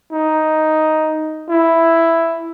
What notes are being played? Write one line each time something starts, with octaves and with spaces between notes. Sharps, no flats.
D#4
E4